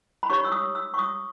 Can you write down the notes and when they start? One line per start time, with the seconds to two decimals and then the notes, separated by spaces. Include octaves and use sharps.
0.23 B5
0.30 D#4 G4 C#5 C#6
0.44 E6
0.52 D#6
0.75 E6
0.94 C#6
0.99 D#6